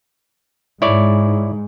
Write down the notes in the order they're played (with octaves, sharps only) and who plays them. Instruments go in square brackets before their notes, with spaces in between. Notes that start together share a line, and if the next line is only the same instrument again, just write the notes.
[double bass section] G#2 [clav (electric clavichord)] E4 C#5 D5